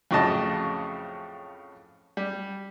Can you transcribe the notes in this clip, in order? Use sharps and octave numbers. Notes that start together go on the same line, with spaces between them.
F2 A2 C#3 F#3 D#5 A5
G3